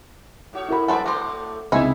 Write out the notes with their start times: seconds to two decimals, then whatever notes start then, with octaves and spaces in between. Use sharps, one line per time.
0.53 A2 F#4 C#5
0.69 E4 A#4 B5
0.88 F#2 G#4 A4 B4 C5 D5 F#5 A5
1.06 A2 A3 F#4 C5
1.72 C#2 G2 C3 D#4 E4 G#4 E5